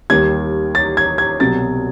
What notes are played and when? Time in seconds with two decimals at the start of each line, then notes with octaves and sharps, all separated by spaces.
0.10 D#2 D#3 G3 G#6
0.75 A6
0.97 G#6
1.18 G#6
1.40 C2 B2 F#3 A6